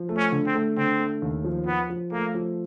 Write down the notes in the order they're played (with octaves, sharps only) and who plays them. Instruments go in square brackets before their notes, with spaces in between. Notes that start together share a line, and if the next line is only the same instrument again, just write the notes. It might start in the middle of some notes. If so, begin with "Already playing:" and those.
Already playing: [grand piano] F3
A3
[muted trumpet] C#4
[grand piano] D3
[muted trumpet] C4
[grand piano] A3
[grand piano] D3 [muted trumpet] C4
[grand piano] A3
D#2
F3
[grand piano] F3 [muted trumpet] B3
[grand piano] F3
[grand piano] A3 [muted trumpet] A#3
[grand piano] F3